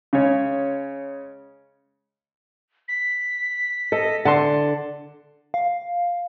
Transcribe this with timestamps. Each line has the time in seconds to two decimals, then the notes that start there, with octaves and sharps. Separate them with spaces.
0.13 C#3 G#3 C#5
2.88 B6
3.92 A4 D#5
4.25 D3 F#5 A5 C6
5.54 F5